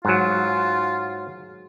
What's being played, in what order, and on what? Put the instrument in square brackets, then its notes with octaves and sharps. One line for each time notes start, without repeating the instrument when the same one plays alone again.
[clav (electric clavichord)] G#2 F#3 [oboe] F4